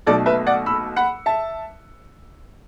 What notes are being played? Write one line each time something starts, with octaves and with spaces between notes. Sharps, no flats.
B1 B2 A3 A4 D5
B4 E5
D5 F#5
B5 E6
F#5 B5
E5 A5